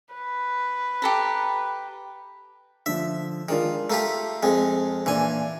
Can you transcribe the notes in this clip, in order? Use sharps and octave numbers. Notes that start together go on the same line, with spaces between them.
B4
G4 A4 A#5
D3 F3 E5
D#3 G#3 D4 F4
A3 F4 G4 A#5
F2 G#3
A#2 E3 D4 G#5